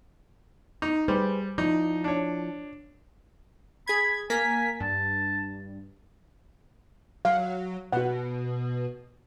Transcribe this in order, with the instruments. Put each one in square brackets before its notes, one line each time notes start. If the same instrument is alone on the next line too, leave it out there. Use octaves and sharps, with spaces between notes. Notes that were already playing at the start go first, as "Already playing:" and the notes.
[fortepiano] D#4
[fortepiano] G3 [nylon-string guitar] G#4 B4 C5
[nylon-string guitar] F3 E4 D5 [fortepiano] D#4
[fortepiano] D4 C#5
[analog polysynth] G#4 G#6 [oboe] B5
[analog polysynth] A#3 A#4 B6 [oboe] G#5
[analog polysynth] G2 [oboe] A5
[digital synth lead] F#3 [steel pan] F5
[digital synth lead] B2 [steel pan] F#4 F#5